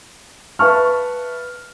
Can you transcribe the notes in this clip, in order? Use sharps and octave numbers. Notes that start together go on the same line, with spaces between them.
B4 E5 F5 A5 C#6 F6